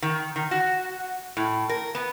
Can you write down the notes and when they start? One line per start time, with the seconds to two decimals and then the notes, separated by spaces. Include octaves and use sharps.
0.02 D#3
0.36 D#3
0.51 F#4
1.37 A2
1.69 A#4
1.95 B3